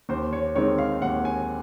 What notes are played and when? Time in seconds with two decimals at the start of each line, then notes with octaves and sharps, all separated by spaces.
0.09 D#2 C5
0.33 C#5
0.55 D#3 G#3 C4 D#4 C#5
0.78 F5
1.02 D#2 F#5
1.25 G#5